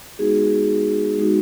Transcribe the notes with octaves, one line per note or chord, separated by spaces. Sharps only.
G#3 B3 D#4 F#4 G#4
G#3 B3 D#4 F#4